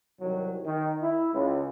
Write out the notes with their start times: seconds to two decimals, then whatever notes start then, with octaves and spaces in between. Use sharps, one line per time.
0.20 C2 D#3 F#3
0.64 D#3
1.01 E4
1.32 C#2